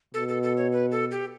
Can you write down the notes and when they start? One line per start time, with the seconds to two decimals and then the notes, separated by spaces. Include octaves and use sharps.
0.14 B2 A4
0.29 A4
0.43 A4
0.57 C#5
0.73 B4
0.91 A4
1.11 G4